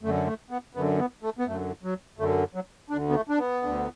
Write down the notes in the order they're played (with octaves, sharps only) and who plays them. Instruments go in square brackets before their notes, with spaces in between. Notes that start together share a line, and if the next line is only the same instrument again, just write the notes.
[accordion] F#2 A3
D3
A3
B3
F#2 D3 B3
B3
A3
B3
F#2 D3 A3
F#3
F#2 D3 A3
F#3
D2 D3 D4
B3
A3
D4
B3
D2 D3